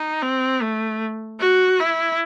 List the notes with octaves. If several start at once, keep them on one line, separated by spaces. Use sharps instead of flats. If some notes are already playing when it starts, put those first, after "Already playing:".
Already playing: D#4
C4
A3
F#4
E4